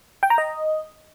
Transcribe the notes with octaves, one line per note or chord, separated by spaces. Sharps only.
G5
A#5
D#5